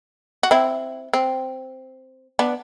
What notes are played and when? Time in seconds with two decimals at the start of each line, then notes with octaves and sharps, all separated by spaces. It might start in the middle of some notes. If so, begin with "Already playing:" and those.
0.43 F#4
0.51 C4 E4
1.13 C4
2.39 B3 D4